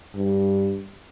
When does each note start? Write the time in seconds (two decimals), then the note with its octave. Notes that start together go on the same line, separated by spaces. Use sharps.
0.15 G2